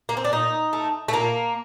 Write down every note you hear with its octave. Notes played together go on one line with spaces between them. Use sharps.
A#3
C4
D4
A#2 D#4
A3
A3
A#2 A#3